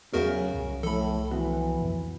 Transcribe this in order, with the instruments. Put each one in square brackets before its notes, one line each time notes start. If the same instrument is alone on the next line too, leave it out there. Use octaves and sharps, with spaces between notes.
[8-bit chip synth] E2 F#4 A#4 [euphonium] C#3 [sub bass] F#3 [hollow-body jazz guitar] G#4 E5 F#5
[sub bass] C2
[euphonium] A2 [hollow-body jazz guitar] F3 A3 [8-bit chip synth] A4 B5
[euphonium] E3 [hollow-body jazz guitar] F3 B3 F#4
[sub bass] F2